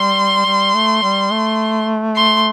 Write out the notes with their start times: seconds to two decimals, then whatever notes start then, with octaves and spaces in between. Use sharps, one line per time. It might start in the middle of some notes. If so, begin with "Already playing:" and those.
Already playing: G3 C6
0.46 G3
0.75 A3
1.03 G3
1.31 A3
2.16 C6